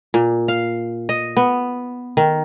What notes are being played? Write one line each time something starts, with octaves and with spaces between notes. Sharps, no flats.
A#2
F5
D#5
B3
D#3